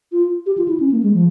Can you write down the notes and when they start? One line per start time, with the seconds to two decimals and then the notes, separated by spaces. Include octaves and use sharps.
0.12 F4
0.46 G4
0.58 F4
0.68 E4
0.80 C#4
0.92 A#3
1.03 G#3
1.14 F3